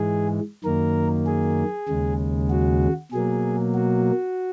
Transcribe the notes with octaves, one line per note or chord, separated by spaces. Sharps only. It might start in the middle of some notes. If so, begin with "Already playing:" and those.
Already playing: G#2 E3 G#3 G#4
F#2 D#3 A#3 A#4
G#4
D#2 C#3 G#3
F#4
B2 F#3 A#3 G#4
F#4